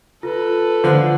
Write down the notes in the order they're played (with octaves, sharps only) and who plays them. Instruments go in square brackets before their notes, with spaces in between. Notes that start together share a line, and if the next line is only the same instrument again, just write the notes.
[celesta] F4 [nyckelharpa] A4 B4
[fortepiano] D3 [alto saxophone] F3